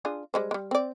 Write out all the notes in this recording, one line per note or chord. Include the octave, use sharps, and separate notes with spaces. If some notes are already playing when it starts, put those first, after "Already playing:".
D4 F4 G#4
G3 G#3 C5
G3 G#3
C4 D5